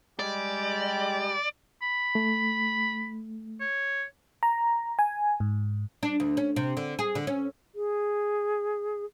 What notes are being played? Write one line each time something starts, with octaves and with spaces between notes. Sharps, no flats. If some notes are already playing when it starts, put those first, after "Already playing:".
G3 G#3 G4 D5
B5
A3
C#5
A#5
G#5
G#2
D4
D2
C#4
C3
D3
G#4
D3
C#4
G#4